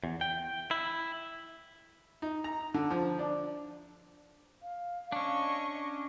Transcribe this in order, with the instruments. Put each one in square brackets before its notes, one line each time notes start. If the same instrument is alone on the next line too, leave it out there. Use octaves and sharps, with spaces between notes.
[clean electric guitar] E2
G5
E4
[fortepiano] D#4
A#5
D3
F3
D4
[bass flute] F5
[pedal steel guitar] C#4 D4 [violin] D#5 C#6